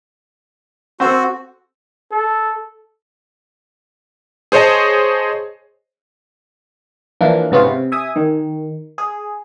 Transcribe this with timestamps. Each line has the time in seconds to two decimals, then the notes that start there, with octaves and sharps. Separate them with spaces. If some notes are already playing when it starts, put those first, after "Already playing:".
1.00 C4 F#4 A4 C5
2.12 A4
4.52 G#4 C5 C#5 D#5 A5
7.21 E3 F3 A#3 D4
7.51 G#2 C3 B3 C#4 F4
7.64 C3
7.92 E5 G#5 D#6
8.16 D#3
8.98 G#4